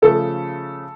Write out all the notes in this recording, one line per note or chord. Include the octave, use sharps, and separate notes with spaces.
C#3 F3 A3 A4